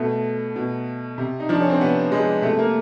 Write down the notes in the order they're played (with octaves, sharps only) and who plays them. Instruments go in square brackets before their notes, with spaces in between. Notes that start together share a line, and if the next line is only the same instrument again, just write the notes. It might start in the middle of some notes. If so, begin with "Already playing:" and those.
Already playing: [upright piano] B2 A3
B2
C3
D#4
F3 D4
C#4
C4
C3 B3
F3 G#3
C3 A3
A#3